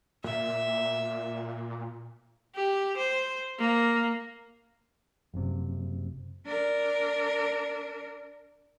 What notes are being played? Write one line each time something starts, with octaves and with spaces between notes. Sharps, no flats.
A#2 E5
G4
C5
A#3
F#1 C3
D4 A#4